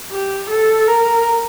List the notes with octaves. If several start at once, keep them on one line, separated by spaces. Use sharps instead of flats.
G4
A4
A#4